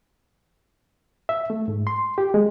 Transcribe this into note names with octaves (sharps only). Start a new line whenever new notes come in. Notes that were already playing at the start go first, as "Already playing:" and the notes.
E5
A3
G#2
C6
G4
G#3